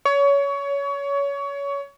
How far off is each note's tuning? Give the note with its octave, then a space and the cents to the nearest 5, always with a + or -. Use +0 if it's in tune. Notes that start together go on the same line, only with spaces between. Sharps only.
C#5 +25